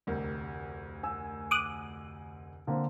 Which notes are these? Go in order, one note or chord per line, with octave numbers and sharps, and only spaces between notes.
F1 D2 A#4
G#5 E6
D6 D#6 F#6
D3 A#3 C4